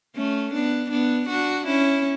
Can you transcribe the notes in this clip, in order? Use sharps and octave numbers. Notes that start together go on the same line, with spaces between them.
A3 C#4
B3 D4
B3 D4
D4 F#4
C#4 E4